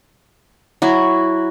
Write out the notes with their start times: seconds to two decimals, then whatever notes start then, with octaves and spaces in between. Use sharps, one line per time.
0.82 F#3 E4 F#4